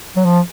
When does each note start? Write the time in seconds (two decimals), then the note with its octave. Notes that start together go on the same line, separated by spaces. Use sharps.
0.17 F#3
0.25 F3